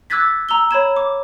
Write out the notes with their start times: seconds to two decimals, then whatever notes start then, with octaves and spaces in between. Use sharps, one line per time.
0.10 D6 E6 F#6 G#6 A6 B6
0.49 A#5 E6 G7
0.71 C#5 B5 G#6 E7
0.96 D6